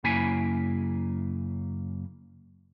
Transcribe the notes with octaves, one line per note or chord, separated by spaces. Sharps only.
F#2 C#3 A#3 E4 G#5 B5